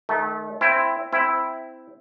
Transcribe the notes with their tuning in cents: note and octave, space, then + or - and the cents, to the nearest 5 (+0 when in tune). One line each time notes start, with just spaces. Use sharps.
D#3 +0 A3 -30
C4 +0 E4 +10
C4 -10 E4 +0